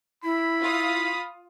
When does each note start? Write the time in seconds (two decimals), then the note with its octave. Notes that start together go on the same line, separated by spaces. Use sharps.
0.24 E4 B5
0.61 F4 F5 D#6